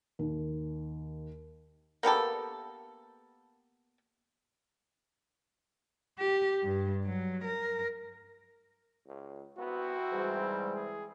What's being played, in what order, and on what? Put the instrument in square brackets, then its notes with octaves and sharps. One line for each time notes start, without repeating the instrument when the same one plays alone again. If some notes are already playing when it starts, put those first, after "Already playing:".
[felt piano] D#2
[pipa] A#3 B3 G4 A4
[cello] G4
G2
F#3
A#4
[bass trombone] C#2
[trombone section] C2 C4 E4 [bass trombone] B3 [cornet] F#4
[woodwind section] G#2 G3 G#3 [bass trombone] E3
[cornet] G#4